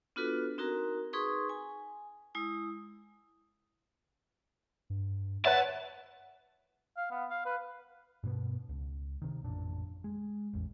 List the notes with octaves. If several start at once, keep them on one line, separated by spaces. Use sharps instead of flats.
B3 D4 F4 F#4 A4 B4
C4 D#4 F#4 A#4 A#5
D#4 G#4 B4 C6 C#6 D#6
G#5
G#3 E4 D#6
G2
B4 C#5 E5 F#5 A5
F5
B3
F5
B4
G2 B2 B3
C#2
C3 D#3
A1 F2 A#2 D4
G#3
A1 E2